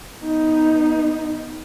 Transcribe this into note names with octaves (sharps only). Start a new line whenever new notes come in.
B3 D#4